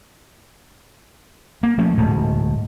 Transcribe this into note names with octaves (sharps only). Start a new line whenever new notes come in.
A#3
F3 A3 C#4
D1 G#2 B2 A3